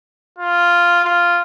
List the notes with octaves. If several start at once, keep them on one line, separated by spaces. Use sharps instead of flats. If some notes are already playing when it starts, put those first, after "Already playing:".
F4
F4